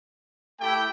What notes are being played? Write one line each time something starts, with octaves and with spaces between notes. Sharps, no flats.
A3 E4 G4 G5